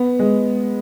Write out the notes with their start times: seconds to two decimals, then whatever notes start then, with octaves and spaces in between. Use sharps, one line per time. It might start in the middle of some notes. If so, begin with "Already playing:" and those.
Already playing: B3
0.19 G#3